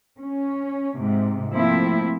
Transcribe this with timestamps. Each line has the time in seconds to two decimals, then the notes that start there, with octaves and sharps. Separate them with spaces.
0.18 C#4
0.97 G#2 C3
1.52 F3 A3 A#3 C4 E4